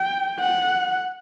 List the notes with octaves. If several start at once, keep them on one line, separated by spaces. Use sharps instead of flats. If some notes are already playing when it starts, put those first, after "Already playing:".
Already playing: G5
F#5